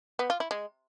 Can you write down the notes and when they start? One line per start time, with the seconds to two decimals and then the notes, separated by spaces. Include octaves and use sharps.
0.19 B3
0.30 F4
0.40 E4
0.51 G#3